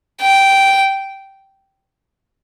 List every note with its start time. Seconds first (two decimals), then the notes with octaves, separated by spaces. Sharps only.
0.21 G5